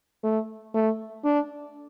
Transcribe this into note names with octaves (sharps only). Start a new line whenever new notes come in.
A3
A3
D4